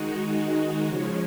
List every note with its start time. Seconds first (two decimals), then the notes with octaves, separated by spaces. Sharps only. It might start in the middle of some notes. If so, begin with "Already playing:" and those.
Already playing: D#3 G#3 D#4 F#4
0.87 C#3 F3 G#3 C#4